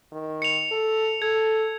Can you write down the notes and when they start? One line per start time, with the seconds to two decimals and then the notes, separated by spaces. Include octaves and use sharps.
0.12 D#3
0.42 C#7 F7
0.71 A4
1.22 A4 G#6